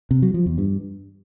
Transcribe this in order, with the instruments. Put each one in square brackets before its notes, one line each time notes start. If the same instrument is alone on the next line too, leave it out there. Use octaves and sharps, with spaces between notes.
[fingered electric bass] C3
F#3
F3
E2
G2